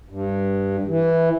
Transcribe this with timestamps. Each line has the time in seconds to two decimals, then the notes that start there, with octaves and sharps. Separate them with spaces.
0.09 G2
0.86 E3